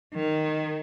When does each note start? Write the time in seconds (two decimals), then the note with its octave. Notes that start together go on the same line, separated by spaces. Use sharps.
0.14 D#3